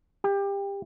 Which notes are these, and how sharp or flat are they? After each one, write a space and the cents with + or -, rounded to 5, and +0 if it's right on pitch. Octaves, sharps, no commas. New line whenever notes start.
G4 +25